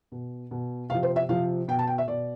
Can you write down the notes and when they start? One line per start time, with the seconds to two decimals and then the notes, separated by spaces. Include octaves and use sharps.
0.12 B2
0.51 B2
0.90 C3 F3 F5
1.03 C5
1.16 E5
1.29 C3 F3 F5
1.68 B2 G5
1.79 A5
1.87 G5
1.98 E5
2.08 B2 D5